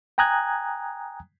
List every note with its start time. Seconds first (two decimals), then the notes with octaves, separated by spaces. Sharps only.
0.18 G5 G#5 A#5 D#6 F#6 G#6